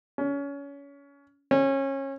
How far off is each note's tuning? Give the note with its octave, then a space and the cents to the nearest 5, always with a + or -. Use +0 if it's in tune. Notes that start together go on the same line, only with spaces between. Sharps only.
C#4 +25
C#4 -25